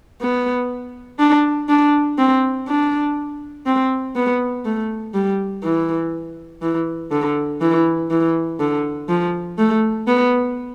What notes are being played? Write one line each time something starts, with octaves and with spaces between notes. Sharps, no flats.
B3
D4
D4
C4
D4
C4
B3
A3
G3
E3
E3
D3
E3
E3
D3
F3
A3
B3